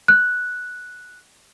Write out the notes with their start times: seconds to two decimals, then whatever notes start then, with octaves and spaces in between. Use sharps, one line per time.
0.08 F#6